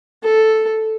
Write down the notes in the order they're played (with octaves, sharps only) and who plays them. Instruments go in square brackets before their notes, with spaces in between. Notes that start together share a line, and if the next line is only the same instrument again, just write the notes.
[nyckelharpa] A4